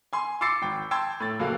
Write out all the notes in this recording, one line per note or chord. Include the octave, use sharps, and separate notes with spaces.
G#5 C6
C6 D6 E6 A6 C7 C#7
G#1 G5
G5 A5 C6 E6 G#6
A2 A6
F#1 A#3 F#4 A4 F5